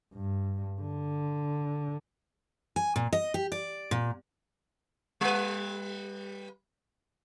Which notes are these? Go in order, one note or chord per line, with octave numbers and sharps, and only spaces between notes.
G2
D3
G#5
A#2
D#5
G4
D5
A#2
G3 B4